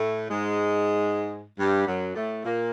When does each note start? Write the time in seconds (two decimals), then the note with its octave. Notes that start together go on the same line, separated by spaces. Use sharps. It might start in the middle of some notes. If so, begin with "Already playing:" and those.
Already playing: A2 A3
0.30 G#2 G#3
1.58 G2 G3
1.87 F#2 F#3
2.15 A2 A3
2.44 A#2 A#3